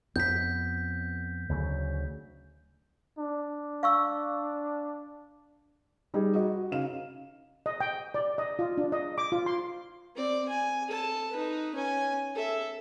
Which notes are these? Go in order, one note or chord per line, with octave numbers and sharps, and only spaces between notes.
F2 B3 G6 B6
D2 C#3 F#3
D4
F5 C#6 E6
G3 D#4 G#4
F#4 D#5
C#3 D#4 F5 E7
D#5
G5
D5
D#5
F4
D4
D#5
D6
F4
C6
C4 D5
G#5
A4 A5
D#4 B4
C#4 G#5
A4 E5